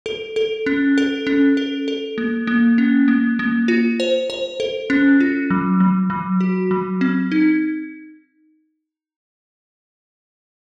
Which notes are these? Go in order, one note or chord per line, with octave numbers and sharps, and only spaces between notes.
A4
A4
C#4
A4
C#4
A4
A4
A#3
A#3
C#4
A#3
A#3
F4
C5
C5
A4
C#4
F4
F#3
F#3
F#3
F#4
F#3
C4
D#4